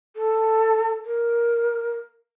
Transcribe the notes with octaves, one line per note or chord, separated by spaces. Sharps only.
A4
A#4